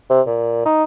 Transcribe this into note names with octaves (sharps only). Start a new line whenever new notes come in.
C3
A#2
D#4